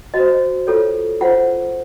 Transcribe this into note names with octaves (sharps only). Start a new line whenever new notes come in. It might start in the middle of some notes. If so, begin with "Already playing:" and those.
F#4 C5 D#5
F4 A4 C#5
F4 C5 F#5